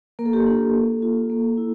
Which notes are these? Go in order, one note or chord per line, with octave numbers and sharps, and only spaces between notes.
A#3 A#4
A4
G4
A4
D4 F4
A#3
F4
A#3
E4